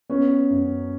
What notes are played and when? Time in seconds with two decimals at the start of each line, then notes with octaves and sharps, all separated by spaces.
0.09 B3 C#4
0.50 F#2